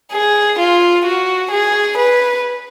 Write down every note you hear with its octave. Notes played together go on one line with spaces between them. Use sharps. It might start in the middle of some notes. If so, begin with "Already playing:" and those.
G#4
F4
F#4
G#4
B4